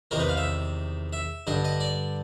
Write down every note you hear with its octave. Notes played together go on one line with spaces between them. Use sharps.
E2 C3 D#3 A#4
B4
F5
E5
E5
G2 D3 D#5
D#5
D5